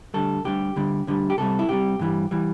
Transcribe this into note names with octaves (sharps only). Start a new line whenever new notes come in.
D2 D3 G3 A4
D2 D3 G3 G4
D2 D3 G3
D2 D3 G3
G4
C2 C3 G3 A4
E4
C2 C3 G3 G4
G2 E3 G3
E3 G3